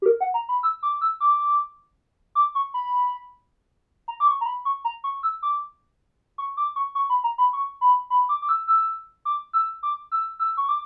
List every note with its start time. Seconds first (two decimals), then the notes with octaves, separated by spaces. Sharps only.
0.02 G4
0.06 A#4
0.21 F#5
0.34 A#5
0.49 B5
0.63 E6
0.83 D6
1.01 E6
1.20 D6
2.35 D6
2.55 C#6
2.74 B5
4.08 A#5
4.20 D6
4.27 C#6
4.41 A#5
4.46 B5
4.65 C#6
4.85 A#5
5.04 C#6
5.23 E6
5.43 D6
6.38 C#6
6.57 D6
6.76 C#6
6.95 C#6
7.10 B5
7.24 A#5
7.38 B5
7.53 C#6
7.81 B5
8.10 B5
8.29 D6
8.42 D6
8.49 E6
8.68 E6
9.25 D6
9.53 E6
9.83 D6
10.12 E6
10.39 E6
10.57 C#6
10.69 D6